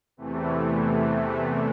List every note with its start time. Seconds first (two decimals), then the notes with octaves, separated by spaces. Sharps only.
0.17 E2 C3 E3 A3